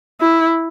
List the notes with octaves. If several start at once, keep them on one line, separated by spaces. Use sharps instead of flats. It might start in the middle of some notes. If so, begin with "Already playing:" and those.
E4